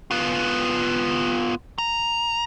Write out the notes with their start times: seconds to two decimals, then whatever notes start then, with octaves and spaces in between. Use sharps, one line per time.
0.11 B3 F4
1.78 A#5